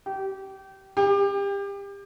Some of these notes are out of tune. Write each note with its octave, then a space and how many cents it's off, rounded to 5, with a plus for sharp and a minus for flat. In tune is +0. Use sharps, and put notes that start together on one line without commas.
G4 -25
G4 +30